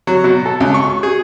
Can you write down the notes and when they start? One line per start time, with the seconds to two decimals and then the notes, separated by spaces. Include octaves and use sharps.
0.07 F#3
0.24 B2
0.46 A4
0.60 C#2
0.74 C#6
1.03 G#4